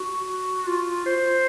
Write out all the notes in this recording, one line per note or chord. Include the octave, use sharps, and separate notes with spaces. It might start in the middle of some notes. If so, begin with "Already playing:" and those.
Already playing: F#4
F4
C5